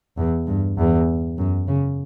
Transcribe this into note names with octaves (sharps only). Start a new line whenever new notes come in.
E2
G2
E2
F#2
C#3